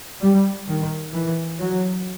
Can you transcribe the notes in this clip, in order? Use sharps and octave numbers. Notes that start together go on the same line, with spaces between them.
G3
D#3
E3
F#3